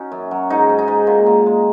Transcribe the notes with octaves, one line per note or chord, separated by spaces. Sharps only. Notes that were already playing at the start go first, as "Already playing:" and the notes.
Already playing: C#4 D#4 F#4
F#2
F#3
G#2 D#4
G#2
D#4
G#2
A#2
A#2
G#3